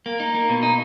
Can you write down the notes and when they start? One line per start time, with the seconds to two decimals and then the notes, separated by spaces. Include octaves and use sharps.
0.06 A#3
0.20 D#4
0.35 A#3
0.49 B2
0.63 D#4